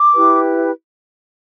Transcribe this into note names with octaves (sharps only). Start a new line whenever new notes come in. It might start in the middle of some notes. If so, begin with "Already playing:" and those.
Already playing: D6
E4 G4 B4